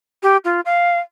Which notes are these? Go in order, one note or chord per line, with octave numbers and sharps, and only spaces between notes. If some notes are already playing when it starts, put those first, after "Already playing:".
G4
F4
F5